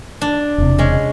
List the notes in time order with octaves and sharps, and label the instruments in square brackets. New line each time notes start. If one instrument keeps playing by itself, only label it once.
[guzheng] D4
[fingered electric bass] E1 C3
[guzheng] G#3 C#4